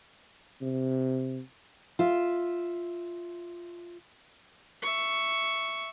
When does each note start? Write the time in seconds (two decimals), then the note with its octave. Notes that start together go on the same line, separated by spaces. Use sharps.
0.62 C3
1.99 F4 E5
4.82 E5 C#6